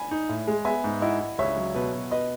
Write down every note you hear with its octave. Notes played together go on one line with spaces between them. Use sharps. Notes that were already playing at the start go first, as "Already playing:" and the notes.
Already playing: G#5 B5
D#4
A2
G#3
B3 E5 G#5
G#2
E4 D#5 F#5
E4
C#2 C#5 E5
F#3
B2 B4
B2
B4 D#5